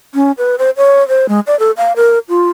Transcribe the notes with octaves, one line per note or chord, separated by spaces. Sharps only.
C#4
B4
C5
C#5
C5
G#3
D5
A4
F5
A#4
F4